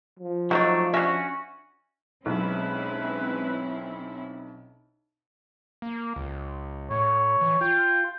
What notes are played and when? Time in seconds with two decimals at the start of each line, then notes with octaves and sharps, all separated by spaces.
0.19 F3
0.51 F#3 A3 D4 D#4 C5 C#5
0.94 C#4 D4 F#4 E5
2.26 B1 G#3 C4 C#4 E4 B4
5.82 A#3
6.16 C#2
6.90 A2 C#5
7.41 E3
7.61 F4 G5